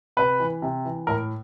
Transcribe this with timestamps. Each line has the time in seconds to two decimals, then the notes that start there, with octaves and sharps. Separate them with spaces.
0.17 C3 B4
0.39 E3
0.62 C3
0.85 E3
1.07 A2 A#4